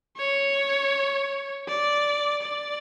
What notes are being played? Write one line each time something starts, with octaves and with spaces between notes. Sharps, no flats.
C#5
D5
D5